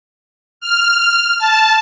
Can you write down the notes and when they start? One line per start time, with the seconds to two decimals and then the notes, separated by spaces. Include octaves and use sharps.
0.61 F6
1.39 A5